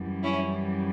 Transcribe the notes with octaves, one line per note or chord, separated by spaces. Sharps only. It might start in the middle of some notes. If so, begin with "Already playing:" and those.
Already playing: F#2 E3 G3
C#4 E4